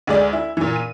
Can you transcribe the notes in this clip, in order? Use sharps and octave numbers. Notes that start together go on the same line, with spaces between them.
D2 G#3 D5
E4
A#2 E3
D#7